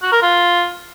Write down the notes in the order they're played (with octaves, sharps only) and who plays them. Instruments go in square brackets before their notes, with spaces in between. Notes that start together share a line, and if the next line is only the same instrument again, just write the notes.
[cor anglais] F#4
A#4
F4